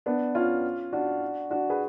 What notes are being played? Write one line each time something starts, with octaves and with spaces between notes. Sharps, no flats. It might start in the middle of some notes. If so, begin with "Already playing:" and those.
B3 D4
C#4 F4
D4 F#4
D4 F#4
G#4 B4